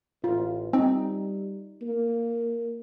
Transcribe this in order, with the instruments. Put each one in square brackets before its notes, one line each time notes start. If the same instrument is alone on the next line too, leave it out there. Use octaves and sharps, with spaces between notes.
[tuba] A1 [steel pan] F4
[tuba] G3 [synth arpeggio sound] C4 [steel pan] D#4
[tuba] A#3